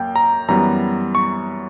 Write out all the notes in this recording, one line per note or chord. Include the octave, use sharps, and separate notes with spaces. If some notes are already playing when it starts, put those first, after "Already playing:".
Already playing: F#2 A#3 G5
A#5
F#2 E3 G3 B3 A#5
C#6